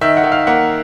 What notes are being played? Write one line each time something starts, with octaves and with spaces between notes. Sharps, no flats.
D#3 E5
F#5
D#3
F5
A#3 F#5